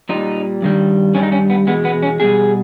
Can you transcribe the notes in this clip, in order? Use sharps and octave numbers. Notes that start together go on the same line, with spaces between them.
A#2 G3 D#4
G2 D#3 G3
G2 D#3 G3 C#4
D#4
C#4
B3
E2 B2 G#3 B3
B3
C#4
B2 G3 G#4